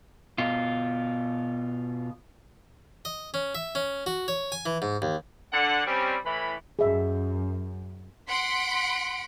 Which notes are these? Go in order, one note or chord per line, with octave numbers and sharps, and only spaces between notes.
B2 F4
D#5
C#4
E5
C#4
F#4
C#5
G#5
E3
G#2
D#2
D3 F#5
G3 C4 C#4
A2 E3 B5
F#2 G#4 E5
F#5 C6 B6 D7